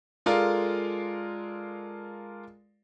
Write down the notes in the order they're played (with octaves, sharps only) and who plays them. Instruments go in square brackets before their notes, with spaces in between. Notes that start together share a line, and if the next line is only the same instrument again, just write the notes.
[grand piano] G#3 F4 A4 A#4 D5 F5